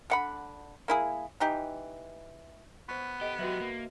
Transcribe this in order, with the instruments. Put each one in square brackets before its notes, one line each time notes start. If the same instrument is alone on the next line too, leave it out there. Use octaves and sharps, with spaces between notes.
[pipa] D3 F#5 B5
A#3 E4 G#4
E3 D#4 G4
[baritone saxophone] B3 [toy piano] C5 C#6
[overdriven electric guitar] G4 [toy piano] A4 D#5
[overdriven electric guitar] F#3 G4 [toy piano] F#4 B4 E5
[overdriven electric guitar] A#3